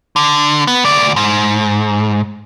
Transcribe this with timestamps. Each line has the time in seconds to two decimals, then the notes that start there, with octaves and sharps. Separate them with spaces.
0.16 D3
0.67 B3
0.84 D2 D5
1.16 G#2